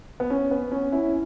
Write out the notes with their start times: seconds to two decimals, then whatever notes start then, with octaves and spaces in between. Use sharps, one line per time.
0.20 B3
0.30 C#4
0.51 B3
0.72 C#4
0.92 C#4 E4